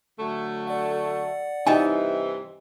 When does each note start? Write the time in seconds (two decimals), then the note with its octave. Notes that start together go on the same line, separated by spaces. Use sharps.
0.20 D3 F#3 A3
0.67 D5 F#5
1.67 G2 C3 E3 D#4 D#5 E5 G5 G#5